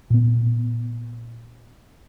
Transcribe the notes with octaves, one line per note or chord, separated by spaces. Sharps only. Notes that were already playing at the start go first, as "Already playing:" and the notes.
A#2 B3